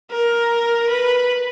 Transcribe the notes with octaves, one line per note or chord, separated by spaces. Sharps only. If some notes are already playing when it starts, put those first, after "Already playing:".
A#4
B4